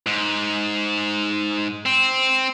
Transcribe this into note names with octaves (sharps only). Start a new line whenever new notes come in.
G#2
C4